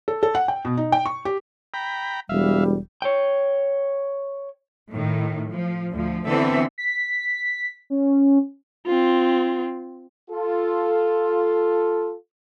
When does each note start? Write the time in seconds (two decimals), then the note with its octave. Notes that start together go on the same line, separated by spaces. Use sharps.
0.08 A4
0.23 A4
0.35 F#5
0.48 G5
0.65 B2
0.77 D#4
0.92 G5
1.06 C#6
1.25 G4
1.74 G5 A#5 B5
2.29 E1 G3 E5 F5
3.02 C#5 G5
4.92 A2 D#3
5.50 F3
5.91 D2 F3
6.27 D3 E3 B3 C4 A4 E5
6.78 B6
7.90 C#4
8.87 C4 F4
10.31 F4 A4